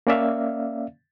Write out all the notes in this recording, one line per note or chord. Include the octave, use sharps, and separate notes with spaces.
A#3 C#4 D5 E5 F5